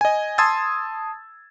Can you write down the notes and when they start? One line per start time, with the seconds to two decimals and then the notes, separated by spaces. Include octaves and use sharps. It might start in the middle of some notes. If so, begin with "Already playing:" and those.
0.01 D#5 G#5
0.38 A5 C6 D#6 E6 G#6 A6